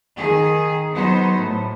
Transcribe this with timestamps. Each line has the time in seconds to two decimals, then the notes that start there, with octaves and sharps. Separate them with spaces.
0.17 D#3 G#4
0.92 F#3 B3 D#4 C5
1.37 A2